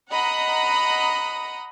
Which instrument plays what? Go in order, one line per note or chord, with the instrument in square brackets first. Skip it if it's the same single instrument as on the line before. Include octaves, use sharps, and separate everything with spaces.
[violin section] D#5 F#5 A#5 B5 D#6